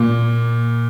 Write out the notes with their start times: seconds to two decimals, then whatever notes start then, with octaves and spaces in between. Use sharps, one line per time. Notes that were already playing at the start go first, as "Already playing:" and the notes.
Already playing: A#2